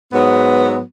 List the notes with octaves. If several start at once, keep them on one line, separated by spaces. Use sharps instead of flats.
G#2 F#3 B3